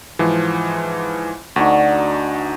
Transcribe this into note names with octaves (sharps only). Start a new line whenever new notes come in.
G#2 E3 F3
D2 D4 D#4 F#4